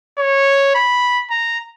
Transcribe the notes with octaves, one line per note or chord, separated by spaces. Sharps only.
C#5
B5
A#5